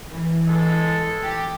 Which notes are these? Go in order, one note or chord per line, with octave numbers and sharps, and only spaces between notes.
E3
G#3 A4
G4